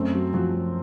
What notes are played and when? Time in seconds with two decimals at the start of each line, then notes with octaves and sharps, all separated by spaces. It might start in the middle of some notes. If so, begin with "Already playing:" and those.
Already playing: F#2 A3 C4
0.14 F#3
0.34 F3 F#3
0.53 F#3